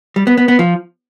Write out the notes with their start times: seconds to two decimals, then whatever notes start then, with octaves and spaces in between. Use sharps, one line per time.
0.16 G3
0.27 B3
0.38 B3
0.48 B3
0.59 F3